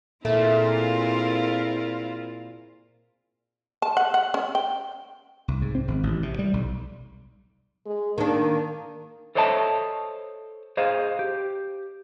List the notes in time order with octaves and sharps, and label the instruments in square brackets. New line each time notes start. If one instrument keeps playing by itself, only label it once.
[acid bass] A#2 [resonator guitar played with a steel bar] A3 [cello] C4 F4 [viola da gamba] E4 G#4 A#4
[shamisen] A5
F#5
F#5
C#4
G5
[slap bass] C2
G#2
C4
G#1
A1
C3
G3
B1
[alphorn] G#3
[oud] D#3 D4 [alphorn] A#3
[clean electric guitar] A4 C5 C#5 D#5 E5 A5
G#4 C5 D#5 F5
G4